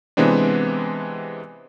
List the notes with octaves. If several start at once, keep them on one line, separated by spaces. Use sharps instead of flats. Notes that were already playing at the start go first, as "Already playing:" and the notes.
C3 E3 G#3 B3 C4 D4